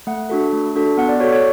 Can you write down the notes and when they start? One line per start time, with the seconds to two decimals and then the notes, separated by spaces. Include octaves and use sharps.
0.07 A3 F#5
0.30 D4 F#4 A4
0.53 A3
0.76 D4 F#4 A4
0.97 B3 F#5
1.09 D5
1.20 F#4 A4 C#5
1.32 C#5